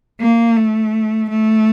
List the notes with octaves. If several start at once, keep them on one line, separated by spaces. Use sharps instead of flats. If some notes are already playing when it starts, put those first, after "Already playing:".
A#3
A3
A3